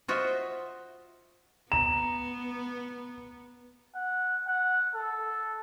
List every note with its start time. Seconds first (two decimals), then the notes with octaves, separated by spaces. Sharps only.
0.08 F4 F#4 C5 D#5 E5
1.72 B3 A#5 E7
3.95 F#5
4.47 F#5
4.95 A4